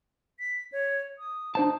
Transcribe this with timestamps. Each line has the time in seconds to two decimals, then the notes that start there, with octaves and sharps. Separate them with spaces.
0.39 B6
0.72 C#5
1.18 D#6
1.55 D4 D#4 C5 A5